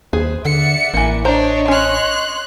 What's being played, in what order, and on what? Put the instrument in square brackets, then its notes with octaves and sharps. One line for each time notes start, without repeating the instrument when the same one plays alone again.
[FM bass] D#2 [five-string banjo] G#4 B4 [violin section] C5
[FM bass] D3 [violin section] D5 E5 F#5 [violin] C#7
[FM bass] A1 [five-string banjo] E3 A#3
[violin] D4 [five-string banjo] C5 A#5 [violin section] C#5 D#5
[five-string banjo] C#4 [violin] C6 F#6